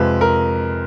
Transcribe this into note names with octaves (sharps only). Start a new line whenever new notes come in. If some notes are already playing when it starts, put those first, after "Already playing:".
Already playing: F2 C3 F3 G#3 B4
A#4